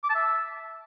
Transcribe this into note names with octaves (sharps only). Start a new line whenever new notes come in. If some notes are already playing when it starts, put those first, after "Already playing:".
D6
A5
E5